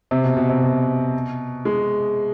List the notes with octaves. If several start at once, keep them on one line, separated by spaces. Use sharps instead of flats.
C3
B2
B2
C3
B2
G#3